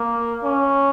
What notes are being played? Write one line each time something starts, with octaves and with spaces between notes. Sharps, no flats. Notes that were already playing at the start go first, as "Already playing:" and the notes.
Already playing: A#3
C#4